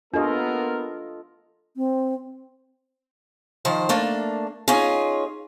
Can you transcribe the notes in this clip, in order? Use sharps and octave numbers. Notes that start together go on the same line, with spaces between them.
A#3 B3 D4 F4 G4 A4 A#4 D#5
C4
D#3 F3 C5
A3 A#3 D4
C#4 D#4 F4 G#4